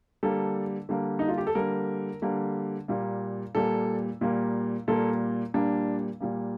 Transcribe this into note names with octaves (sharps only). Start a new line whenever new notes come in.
D3 G3 A#3 A4
D3 G3 A#3
D#4
F4
G4
A4
D3 G3 A#3 A#4
D3 G3 A#3
A#2 G3 A#3
A#2 G3 A#3 A4
A#2 G3 A#3
A#2 G3 A#3 A4
A#2 G3 A#3 D4
A#2 G3 A#3